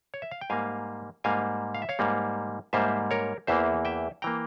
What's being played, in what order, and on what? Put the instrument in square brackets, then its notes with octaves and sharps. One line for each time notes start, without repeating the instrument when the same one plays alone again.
[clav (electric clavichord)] C#5
E5
F5
G5
G#2 G3 A#3 F5 G#5
G#2 G3 A#3 F5 G#5
F5
E5
C#5 F5
G#2 G3 A#3
G#2 G3 A#3 C5 E5
A#4 C#5
E2 E3 A#3 C5 E5
E5 G5
E3 A#3 G5 A#5